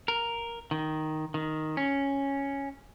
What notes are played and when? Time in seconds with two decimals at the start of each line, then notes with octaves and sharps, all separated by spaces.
0.08 A#4
0.71 D#3
1.34 D#3
1.77 C#4